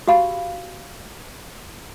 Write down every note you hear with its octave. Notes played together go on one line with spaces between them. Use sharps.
F#4 G4 F5 B5